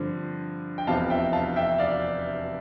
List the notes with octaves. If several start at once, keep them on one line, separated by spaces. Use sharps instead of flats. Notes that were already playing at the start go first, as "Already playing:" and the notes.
Already playing: G2 D3 F3 C4
G5
F1 E2 C3 F3 F5 A5
E5 G5
F5 A5
E5 G5
D5 F5